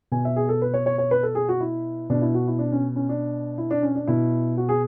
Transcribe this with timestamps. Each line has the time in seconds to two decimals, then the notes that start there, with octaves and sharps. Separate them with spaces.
0.12 B2 G#5
0.25 E5
0.36 G#4
0.49 A4
0.62 B4
0.74 C#5
0.86 C#5
0.98 C#5
1.11 B4
1.23 A4
1.35 G#4
1.49 F#4
1.61 E4
2.10 B2 D4
2.22 E4
2.35 F#4
2.48 E4
2.59 D4
2.72 C#4
2.96 C#4
3.09 D4
3.58 E4
3.71 D4
3.83 C#4
3.95 D4
4.07 B2 E4
4.58 F#4
4.69 G#4